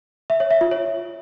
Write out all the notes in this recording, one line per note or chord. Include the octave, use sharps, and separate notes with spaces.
E5
C#5
E5
F4
C#5